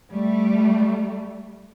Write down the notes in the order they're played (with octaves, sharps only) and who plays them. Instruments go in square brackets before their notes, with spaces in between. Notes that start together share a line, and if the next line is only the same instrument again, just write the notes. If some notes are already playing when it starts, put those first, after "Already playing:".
[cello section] G3 A3